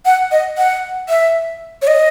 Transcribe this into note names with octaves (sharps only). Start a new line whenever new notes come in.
F#5
D#5
F#5
E5
C#5
D#5